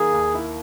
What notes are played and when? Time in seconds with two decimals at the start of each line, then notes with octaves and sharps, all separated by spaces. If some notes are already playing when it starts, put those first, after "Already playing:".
Already playing: D#3 A#3 G#4
0.13 D#2
0.35 E4